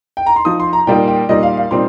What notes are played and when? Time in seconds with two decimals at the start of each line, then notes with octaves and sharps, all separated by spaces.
0.17 G5
0.26 A#5
0.36 C6
0.45 F3 D#4 D#6
0.60 C6
0.73 A#5
0.87 A#2 G3 A#3 D#4 G5
1.08 G5
1.29 A#2 G3 D#4 D#5
1.43 F5
1.57 F5
1.71 A#2 G3 C4 D#4 C6